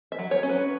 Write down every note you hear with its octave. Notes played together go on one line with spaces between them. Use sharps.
E5
F#3
C#5
C#4
B4